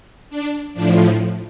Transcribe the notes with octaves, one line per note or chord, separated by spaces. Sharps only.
D4
A2 F3 D4